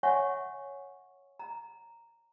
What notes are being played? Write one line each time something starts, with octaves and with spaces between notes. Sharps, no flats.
C#5 E5 F#5 G#5 C6 C#6
A#5